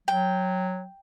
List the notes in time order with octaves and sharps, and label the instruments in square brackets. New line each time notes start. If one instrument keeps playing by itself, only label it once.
[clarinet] F#3 [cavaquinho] G5